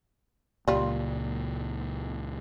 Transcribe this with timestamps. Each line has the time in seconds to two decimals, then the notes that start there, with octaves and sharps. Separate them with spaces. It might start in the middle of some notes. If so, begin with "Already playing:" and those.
0.68 C#2 A#2 G3 F4